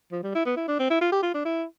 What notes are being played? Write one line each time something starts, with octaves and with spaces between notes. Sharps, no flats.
F3
G3
E4
B3
E4
D4
C4
E4
F4
G4
F4
D4
E4